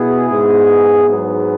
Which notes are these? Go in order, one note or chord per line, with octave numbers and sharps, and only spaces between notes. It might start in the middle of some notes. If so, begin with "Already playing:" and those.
Already playing: B2 B3 E4 G#4
G#2 G#3 B3
G#2 F#3 B3